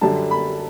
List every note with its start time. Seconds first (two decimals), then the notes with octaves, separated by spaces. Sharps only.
0.01 F#2 D3 G3 A5
0.31 B5